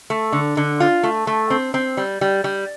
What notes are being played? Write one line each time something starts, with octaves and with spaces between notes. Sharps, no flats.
A3
D3
D3
F4
A3
A3
C4
C4
G3
G3
G3